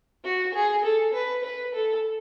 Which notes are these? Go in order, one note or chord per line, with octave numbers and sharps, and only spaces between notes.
F#4
G#4
A4
B4
B4
A4